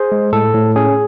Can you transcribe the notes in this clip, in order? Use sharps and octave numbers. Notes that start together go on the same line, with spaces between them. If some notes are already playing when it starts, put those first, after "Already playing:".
Already playing: G#4 C5
G#3
A2 A4
A2
C#4 G#4